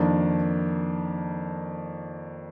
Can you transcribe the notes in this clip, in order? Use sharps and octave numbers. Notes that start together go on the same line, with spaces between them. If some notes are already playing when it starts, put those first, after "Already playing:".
Already playing: F2 D#3 A#3 D4